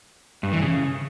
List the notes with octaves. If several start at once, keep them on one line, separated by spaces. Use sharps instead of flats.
G2
E3
C#3